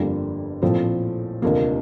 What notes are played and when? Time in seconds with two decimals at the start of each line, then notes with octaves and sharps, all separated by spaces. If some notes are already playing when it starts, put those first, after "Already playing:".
Already playing: G1 F2 D3 G3 A#3
0.62 A#1 A2 F3 C4 F4
1.42 F1 D#2 D3 F3 A#3